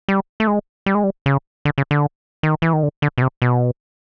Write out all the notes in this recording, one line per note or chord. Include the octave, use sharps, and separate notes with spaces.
G3
A3
G#3
G3
G#3
G3
C#3
D3
C#3
D3
D#3
E3
D#3
D3
D3
B2
C3
B2